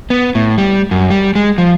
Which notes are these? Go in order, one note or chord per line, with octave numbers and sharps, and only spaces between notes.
B3
A2
G3
F#2
G3
G#3
F3